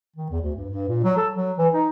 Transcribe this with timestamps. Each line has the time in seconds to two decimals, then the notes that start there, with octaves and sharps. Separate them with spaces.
0.16 D#3
0.30 E2
0.42 D2
0.56 G2
0.70 G2
0.89 A#2
1.04 F#3
1.17 A4
1.33 F#3
1.58 E3
1.74 D#4